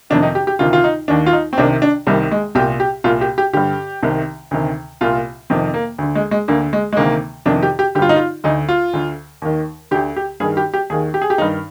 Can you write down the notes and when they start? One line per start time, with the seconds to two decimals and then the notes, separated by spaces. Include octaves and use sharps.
0.10 F2 C3 D#3 D4
0.23 D#4
0.35 G4
0.47 G4
0.59 D2 C3 D#3 F4
0.73 F4
0.84 D#4
1.08 D#2 D#3 D4
1.26 F4
1.33 D#4
1.53 C4
1.57 C2 C3 D#3 D4
1.82 D4
2.07 C2 C3 D#3 G3
2.31 G#3
2.55 C2 A#2 G4
2.80 G4
3.04 C2 A#2 F4
3.21 G4
3.38 G4
3.53 G2 D3 G4
4.03 C2 C3 D#3
4.51 D2 C3 D#3
5.01 C2 A#2 F4
5.50 F2 C3 D#3 C4
5.74 A#3
5.98 D2 D3
6.15 G#3
6.31 G#3
6.48 D2 D3 A#3
6.73 G#3
6.93 G#3
6.97 D2 C3 D#3 A#3
7.46 F2 C3 D#3 D4
7.63 G4
7.79 G4
7.95 D3 G4
7.99 G2 F4
8.09 D#4
8.16 F4
8.44 D2 D3 D#4
8.69 F4
8.93 D2 D3
9.42 D#2 D#3
9.91 D2 D3 G4
10.16 G4
10.40 G2 G#4
10.43 D#3
10.57 G4
10.74 G4
10.90 D#2 G#4
10.93 D#3
11.14 G4
11.22 G#4
11.30 G4
11.38 G2 D#3 D#4